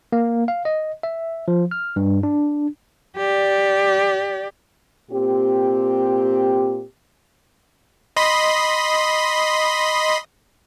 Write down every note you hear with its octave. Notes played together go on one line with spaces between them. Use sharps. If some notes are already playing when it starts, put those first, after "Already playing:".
A#3
F5
D#5
E5
F3
F6
G2
D4
G4 D5
A#2 C4 G4
D#5 B5 C6